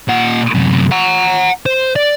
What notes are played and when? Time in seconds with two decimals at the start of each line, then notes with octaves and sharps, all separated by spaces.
0.08 A#2 F#5
0.55 F#2 C3
0.92 F#5 A#5
1.66 C5
1.96 D5